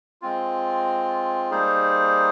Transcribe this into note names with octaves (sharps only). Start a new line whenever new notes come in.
G#3 C4 F4
G3 A#3 D#4 G#4 C5